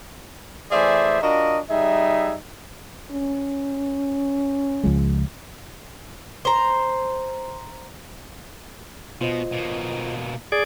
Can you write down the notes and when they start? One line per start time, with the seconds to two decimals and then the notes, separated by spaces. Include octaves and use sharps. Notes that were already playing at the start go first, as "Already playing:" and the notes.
0.72 E3 A3 G#4 C5 D5 E5
1.22 D4 F4 F#4 A#4 D#5
1.70 G3 D#4 G#4 E5
3.11 C#4
4.83 C#2 F3 G#3
6.45 C5 A#5
9.21 B2 F4 C5 D#5
9.52 B2 A#3
10.52 G#4 D5